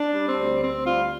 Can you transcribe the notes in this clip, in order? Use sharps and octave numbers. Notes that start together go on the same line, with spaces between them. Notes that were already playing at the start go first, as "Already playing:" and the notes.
Already playing: D4
G3
C4
D2
D2 C4
G3 F4